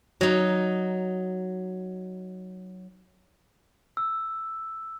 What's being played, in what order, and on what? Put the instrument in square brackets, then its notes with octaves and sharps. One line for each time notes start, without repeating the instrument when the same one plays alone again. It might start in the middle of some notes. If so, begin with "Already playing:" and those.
[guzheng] F#3 D#4
[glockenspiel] E6